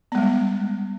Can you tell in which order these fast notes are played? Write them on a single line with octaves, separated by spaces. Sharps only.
B3 G#3 G3